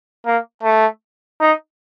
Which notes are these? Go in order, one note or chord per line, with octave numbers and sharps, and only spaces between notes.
A#3
A3
D#4